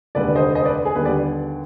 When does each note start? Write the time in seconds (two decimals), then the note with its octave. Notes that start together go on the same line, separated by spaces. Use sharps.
0.15 F1 D#2 D3 G#3 B4 D5
0.35 C5 D#5
0.55 C5 D#5
0.65 B4 D5
0.85 G#4
0.95 D#2 D3 G3 B3 B4
1.05 B4 D5